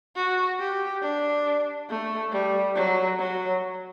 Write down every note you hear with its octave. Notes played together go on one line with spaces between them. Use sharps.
F#4
G4
D4
A3
G3
F#3
F#3